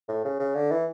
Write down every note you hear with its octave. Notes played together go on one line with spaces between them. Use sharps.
A2
C#3
C#3
D3
E3